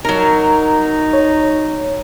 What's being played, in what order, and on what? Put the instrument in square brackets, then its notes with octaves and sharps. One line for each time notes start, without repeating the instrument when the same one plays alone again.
[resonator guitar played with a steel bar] F#3 A#4 [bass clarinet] D#4
[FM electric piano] C#5